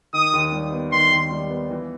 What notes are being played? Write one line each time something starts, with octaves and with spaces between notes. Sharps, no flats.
D#3 D#6
D#2
G3
B3
D#3 C6
D#2
G3
B3
E3